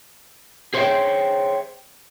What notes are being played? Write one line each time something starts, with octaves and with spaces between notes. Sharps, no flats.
G#4 C5 C#5 D#5 E5 G5